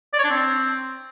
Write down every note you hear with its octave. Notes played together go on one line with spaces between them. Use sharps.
D5
C#5
D4
C4